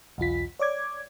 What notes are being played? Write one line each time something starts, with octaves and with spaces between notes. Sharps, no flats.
B1 E2 F4 B6
C#5 D5 D6 G#6